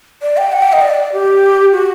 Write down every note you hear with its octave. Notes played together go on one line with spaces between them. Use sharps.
D5
G5
F#5
G5
D#5
D5
G4
F#4